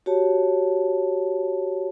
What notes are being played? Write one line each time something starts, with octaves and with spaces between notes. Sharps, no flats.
F#4 G4 C#5 A5